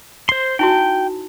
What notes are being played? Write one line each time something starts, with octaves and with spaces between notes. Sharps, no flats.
C5 C6
D#4 E4 F#4 G5